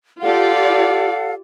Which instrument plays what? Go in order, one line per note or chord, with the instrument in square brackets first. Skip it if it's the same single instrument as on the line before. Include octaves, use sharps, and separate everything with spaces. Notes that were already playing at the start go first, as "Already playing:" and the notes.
[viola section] F4 G4 D5 [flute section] A4 F5 F#5